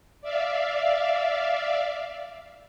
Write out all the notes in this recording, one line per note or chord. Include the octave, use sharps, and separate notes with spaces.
D5 E5 F5